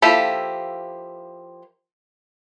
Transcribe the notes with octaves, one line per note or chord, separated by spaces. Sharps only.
F3 A#3 E4 G4 A4